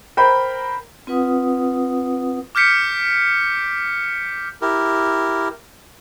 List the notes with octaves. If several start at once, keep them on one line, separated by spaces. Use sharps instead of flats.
A#4 C5 G5 B5
C4 F4 B4 F#5 D#6
D6 F6 G6 B6 C#7 D7
E4 G4 A#4